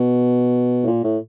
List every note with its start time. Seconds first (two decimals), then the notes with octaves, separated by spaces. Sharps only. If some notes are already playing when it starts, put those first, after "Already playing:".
Already playing: B2
0.83 A2
0.87 A#2
1.04 A2